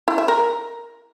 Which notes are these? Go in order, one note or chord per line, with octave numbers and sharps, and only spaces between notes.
E4
E5
A#4